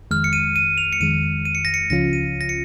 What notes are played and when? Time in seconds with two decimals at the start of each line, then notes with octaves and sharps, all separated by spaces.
0.11 F2 D#3 G#3 F6
0.24 C#7
0.33 D#7
0.56 D#7
0.78 F7
0.93 C#7
1.00 F2 D#3 G#3 D#7
1.45 D#7
1.55 C#7
1.65 A#6
1.74 C#7
1.90 C#2 C#3 F3 C#4 F4 A#6
2.13 D#7
2.41 A#6
2.49 C#7